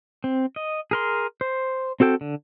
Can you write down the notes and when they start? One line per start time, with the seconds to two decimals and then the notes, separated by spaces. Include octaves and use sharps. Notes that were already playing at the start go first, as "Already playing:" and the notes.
0.24 C4
0.56 D#5
0.91 G#4 A#4 C6
1.41 C5
2.00 C4 F#4 A4 G5
2.21 D3